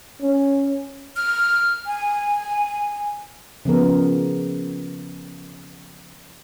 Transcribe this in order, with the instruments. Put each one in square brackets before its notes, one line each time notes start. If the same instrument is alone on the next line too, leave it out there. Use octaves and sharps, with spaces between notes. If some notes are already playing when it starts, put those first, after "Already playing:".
[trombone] C#4
[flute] F6
G#5
[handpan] C#3 F3 B3 A#4